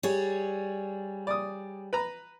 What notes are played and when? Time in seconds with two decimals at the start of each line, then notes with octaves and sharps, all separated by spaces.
0.03 G3 G#4 C#5
1.27 D5 D#6
1.93 B4 A#5